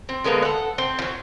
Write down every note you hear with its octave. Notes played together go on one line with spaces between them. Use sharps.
C4
D3 G#3 A#3 B3
A4 F#5
C4
F3 F#3